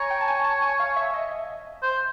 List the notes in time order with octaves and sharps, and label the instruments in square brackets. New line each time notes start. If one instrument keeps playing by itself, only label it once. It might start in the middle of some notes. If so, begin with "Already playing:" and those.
Already playing: [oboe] C#5 [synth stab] G#5 A#5
[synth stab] G5
A5
G#5
A5
G#5
F5
E5
D#5
[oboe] C5